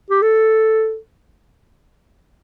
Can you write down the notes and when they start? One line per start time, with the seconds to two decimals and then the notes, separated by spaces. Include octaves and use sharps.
0.11 G4
0.22 A4